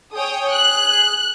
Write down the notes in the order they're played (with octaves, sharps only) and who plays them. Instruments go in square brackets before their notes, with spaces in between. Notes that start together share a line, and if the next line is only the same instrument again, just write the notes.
[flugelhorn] G#4 [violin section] C#5 G5 D#6
[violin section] F#6